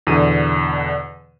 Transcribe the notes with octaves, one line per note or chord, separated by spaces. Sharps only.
E2 B2 D3 D#7